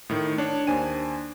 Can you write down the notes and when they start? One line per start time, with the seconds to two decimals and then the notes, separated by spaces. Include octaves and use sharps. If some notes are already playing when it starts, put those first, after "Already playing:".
0.09 A2 D#3
0.38 D4 C#5
0.67 D#2 D4 C5 G#5 D#7